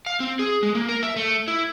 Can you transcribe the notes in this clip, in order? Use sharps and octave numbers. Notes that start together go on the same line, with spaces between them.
F5
C4
G#4
G#3
A#3
A#4
E5
A3
E4